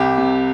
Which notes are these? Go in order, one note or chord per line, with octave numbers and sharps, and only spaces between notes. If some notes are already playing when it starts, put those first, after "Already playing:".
Already playing: C2 G4
C3